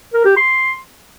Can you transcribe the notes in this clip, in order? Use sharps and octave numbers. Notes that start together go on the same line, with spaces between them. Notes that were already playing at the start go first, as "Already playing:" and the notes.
A#4
G4
C6